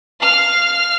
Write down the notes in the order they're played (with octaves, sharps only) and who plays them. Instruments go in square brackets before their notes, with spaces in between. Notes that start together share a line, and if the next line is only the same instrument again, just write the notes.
[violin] F5 F6